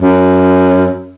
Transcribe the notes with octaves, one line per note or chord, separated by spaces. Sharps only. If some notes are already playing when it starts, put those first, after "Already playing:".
F#2